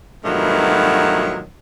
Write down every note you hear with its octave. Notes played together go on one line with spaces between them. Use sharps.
G2 B2 D#3 F3 F#3 A3